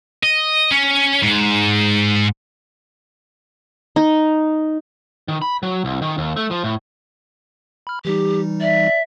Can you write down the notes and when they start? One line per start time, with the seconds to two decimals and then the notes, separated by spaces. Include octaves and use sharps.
0.23 D#5
0.71 C#4
1.23 G#2
3.96 D#4
5.28 D#3
5.42 B5
5.63 F#3
5.85 C2
6.02 D#3
6.18 D#2
6.37 A3
6.51 F3
6.64 A2
7.87 B5 F6
8.05 E3 G3 D#4 G4
8.61 D5 E5